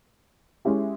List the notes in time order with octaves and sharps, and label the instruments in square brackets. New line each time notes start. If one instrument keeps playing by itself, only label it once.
[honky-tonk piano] G#3 C#4 E4 G4